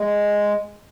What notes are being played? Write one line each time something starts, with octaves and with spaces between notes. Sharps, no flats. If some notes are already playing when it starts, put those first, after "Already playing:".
Already playing: G#3